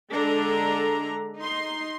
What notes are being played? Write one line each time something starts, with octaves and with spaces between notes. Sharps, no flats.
D3 G#3 D4 A4 A#5
D#4 C6